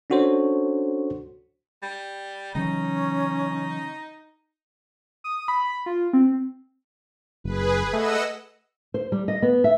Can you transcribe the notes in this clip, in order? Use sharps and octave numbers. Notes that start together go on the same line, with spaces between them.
C#4 D4 F#4 A4 C5 C#5
G3
C#3 E3 F#3 C#4 D#4
D#6
B5
F4
C4
F#1 G#4 B4
A3 D#5 F#5 E6
C5
G3
D#5
B3
E5